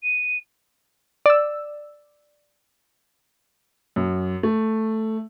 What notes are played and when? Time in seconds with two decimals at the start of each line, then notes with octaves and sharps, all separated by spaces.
0.03 D#7
1.26 D5 E6
3.96 F#2
4.43 A3